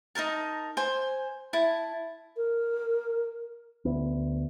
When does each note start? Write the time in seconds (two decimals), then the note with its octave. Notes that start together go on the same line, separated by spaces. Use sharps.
0.15 D#4 A4 A#4 A5
0.77 C5 G#5
1.53 E4 A5
2.37 A#4
3.85 D2 B3